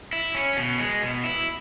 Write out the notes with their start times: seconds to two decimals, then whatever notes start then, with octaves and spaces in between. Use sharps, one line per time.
0.13 E4
0.35 C#4
0.57 B2
0.80 G#3
1.02 B2
1.24 E4